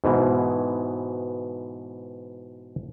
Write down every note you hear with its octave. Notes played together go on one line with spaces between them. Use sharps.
G#2 B2 E3